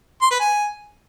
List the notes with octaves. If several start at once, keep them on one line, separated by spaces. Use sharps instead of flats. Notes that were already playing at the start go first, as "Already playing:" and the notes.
C6
B4
G#5